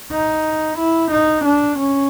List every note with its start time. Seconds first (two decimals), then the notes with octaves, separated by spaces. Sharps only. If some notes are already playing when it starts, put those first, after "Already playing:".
0.12 D#4
0.79 E4
1.11 D#4
1.45 D4
1.79 C#4